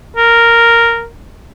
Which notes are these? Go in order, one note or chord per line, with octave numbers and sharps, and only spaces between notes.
A#4